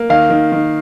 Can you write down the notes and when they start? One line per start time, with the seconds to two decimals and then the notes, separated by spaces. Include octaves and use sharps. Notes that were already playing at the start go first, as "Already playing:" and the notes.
Already playing: A#3
0.10 D#3 F5
0.30 D#3
0.52 D#3